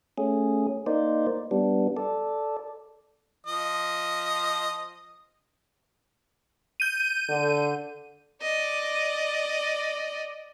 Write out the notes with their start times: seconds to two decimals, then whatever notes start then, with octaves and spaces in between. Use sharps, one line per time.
0.18 A3 C#4 G#4
0.86 A#3 D#4 C5 D5
1.51 G3 B3 D4
1.97 A4 D5
3.46 F3 D#5
6.80 G6 D#7
7.28 D3
8.42 D5 D#5